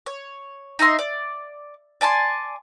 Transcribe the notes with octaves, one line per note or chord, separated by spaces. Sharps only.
C#5
D#4 D#5 E5 C6
D5
D5 G#5 A5 C6